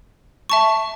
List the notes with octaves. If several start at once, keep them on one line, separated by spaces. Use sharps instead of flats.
E5 A5 C#6